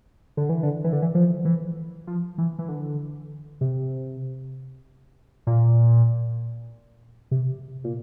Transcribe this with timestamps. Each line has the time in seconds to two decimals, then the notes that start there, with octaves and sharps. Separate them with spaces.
0.37 D3
0.49 E3
0.63 D3
0.84 E3
0.93 D3
1.02 E3
1.15 F3
1.45 E3
2.07 F3
2.38 E3
2.59 E3
2.69 D3
3.61 C3
5.47 A#2
7.31 C3
7.84 A#2